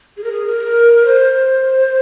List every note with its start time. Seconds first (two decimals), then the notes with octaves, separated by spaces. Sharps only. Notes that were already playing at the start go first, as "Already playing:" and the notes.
0.17 G#4
0.24 A#4
0.31 G#4
0.46 A#4
1.06 C5